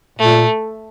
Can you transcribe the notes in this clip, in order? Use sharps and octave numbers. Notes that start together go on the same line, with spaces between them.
A#2 A3